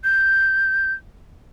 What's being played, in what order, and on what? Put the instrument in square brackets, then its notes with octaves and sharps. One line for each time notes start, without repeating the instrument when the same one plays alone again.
[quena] G6